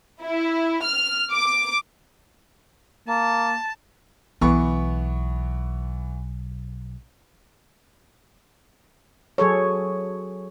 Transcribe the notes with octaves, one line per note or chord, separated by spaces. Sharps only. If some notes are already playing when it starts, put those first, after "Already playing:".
E4
F6
D6
A#3 A5
B1 E3 B3 C#6
F#3 G#4 A4 C#5